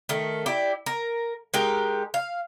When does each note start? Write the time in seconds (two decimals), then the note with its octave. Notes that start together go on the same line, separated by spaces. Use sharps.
0.09 D#3 A3
0.46 E4 G4 D5
0.86 A#4
1.54 G#3 D#4 G4 A#4
2.14 F5